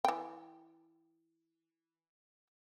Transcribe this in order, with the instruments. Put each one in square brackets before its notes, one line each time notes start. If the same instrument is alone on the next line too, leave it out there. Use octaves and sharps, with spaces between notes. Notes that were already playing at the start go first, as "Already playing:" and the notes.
[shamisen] E3 G5